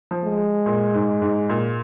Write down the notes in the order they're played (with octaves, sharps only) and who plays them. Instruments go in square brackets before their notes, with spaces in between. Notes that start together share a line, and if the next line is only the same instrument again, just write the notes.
[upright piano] F3
[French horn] G#3
[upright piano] A#2
G#2
G#2
A#2